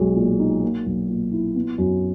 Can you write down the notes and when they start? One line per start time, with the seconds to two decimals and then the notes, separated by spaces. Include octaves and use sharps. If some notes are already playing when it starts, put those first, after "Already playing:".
Already playing: B1 G#3
0.15 A#2
0.39 D#4
0.63 A#3
0.86 B1
1.09 A#2
1.32 E4
1.55 B3
1.78 F#2